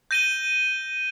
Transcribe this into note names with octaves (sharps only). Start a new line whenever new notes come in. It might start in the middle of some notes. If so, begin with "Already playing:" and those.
G6 A#6 D#7 G7